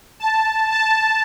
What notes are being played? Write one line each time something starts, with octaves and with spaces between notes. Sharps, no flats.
A5
A5